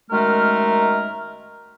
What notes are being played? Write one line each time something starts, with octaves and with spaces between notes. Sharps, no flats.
F#2 D#3 G#3 A3 A#4 F6